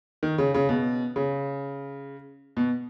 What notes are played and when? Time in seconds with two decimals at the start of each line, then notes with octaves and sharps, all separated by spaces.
0.23 D#3
0.38 C#3
0.54 C#3
0.69 B2
1.16 C#3
2.57 B2